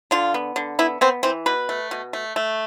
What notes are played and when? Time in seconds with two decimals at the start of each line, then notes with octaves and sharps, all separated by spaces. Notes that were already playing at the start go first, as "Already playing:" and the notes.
0.11 D3 F4
0.34 B3
0.56 D3
0.79 B3 E4
1.01 B3 C4
1.23 E3 C4
1.46 B2 B4
1.69 A3
1.91 B2
2.13 A3
2.36 A3